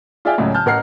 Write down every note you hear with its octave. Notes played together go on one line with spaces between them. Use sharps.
F4 G#4 D5 E5 F5 G5
C#2 A2 C#3 F#3
A5 F6 G6
A1 A#4 F#5 F6 C7